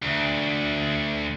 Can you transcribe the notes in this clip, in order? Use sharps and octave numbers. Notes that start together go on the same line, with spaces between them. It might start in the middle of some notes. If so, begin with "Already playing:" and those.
D2